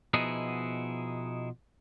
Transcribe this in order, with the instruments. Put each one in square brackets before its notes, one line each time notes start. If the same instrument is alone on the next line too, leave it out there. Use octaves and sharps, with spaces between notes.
[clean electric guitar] B2 F3 B3 D#4 E4 G#4